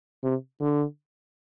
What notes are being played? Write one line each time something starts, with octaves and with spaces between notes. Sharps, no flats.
C3
D3